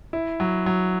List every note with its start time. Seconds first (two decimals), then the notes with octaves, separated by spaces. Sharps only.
0.13 E4
0.40 F#3
0.66 F#3